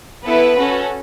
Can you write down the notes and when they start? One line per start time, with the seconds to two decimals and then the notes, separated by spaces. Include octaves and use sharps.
0.23 B3 E4 A4 B4
0.56 C#4 F#4 A4